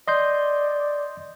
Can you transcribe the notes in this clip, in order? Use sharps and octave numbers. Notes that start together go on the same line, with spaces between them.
D5 D#5 C6 G6